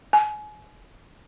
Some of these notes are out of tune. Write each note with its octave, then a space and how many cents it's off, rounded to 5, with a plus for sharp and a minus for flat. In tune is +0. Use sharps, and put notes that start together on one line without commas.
G#5 +30